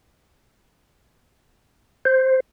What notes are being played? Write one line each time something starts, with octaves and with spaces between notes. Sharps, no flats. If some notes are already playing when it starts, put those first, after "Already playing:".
C5